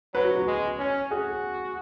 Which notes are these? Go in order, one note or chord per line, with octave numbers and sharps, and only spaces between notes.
F#3 B4
F#4
F#4
G#3
C#4
F#4 G#4